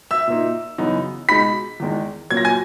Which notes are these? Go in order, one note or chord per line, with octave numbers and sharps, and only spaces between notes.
E5 E6
A#2 A#3 D#4
F#2 C#3 E3 B3 D#4
B2 G#3 D#4 B5 B6
E2 D#3 G#3
A#2 F#3 A#3 C#4 G#6
A#6
G#5 G#6